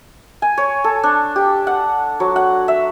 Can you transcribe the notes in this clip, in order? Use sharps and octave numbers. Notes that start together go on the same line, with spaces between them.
G#5
C#5
A4
D4
G4
F#5
F#3
F#5
E5